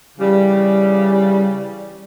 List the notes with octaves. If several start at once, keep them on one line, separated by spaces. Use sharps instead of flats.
C#3 E3 G3